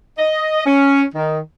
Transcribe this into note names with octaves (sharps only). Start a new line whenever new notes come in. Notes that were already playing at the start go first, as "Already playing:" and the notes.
D#5
C#4
D#3